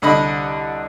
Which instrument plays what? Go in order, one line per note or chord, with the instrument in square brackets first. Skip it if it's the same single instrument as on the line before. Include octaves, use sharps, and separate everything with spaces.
[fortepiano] C2 D3 D#5 B5